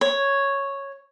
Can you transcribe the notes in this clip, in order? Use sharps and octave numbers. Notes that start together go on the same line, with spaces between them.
C#5